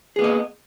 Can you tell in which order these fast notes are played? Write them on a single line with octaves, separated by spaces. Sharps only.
G#4 B3 A#3 D#5